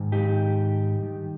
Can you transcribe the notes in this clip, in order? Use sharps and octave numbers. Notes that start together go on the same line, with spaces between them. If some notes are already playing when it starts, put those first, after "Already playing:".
Already playing: G#2 D#3
D#4 G4
G2 D#3